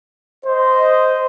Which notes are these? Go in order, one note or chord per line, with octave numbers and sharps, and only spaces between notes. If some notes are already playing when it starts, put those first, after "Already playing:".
C5 D#5